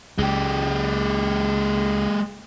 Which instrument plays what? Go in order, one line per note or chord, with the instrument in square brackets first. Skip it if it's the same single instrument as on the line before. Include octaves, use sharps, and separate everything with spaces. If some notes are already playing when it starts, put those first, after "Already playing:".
[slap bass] C#2 [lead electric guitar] G#3 G4